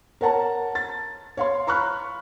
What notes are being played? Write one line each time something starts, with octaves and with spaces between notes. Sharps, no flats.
A#4 C#5 F#5 A5 A#5
A6
C#5 F5 C6
A#5 B5 C#6 F6 F#6